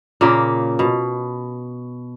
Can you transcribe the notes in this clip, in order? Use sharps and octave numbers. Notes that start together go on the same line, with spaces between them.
A#2 C#3 A#3
B2